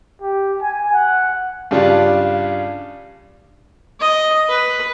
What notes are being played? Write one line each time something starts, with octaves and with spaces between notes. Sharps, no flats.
G4
G#5
F#5
G2 C#3 G3 D4 F4
D#5
B4